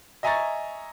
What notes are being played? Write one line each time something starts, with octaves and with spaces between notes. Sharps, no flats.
D#5 E5 G#5 A#5 C#6 A6